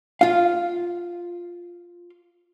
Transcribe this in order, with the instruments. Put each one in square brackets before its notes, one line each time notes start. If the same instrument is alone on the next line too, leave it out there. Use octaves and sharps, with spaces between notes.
[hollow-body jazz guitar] F4 F5